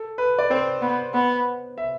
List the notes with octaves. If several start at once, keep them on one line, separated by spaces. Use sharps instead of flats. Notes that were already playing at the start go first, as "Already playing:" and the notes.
Already playing: A4
B4
D5
C4 C5
B3
B3
E5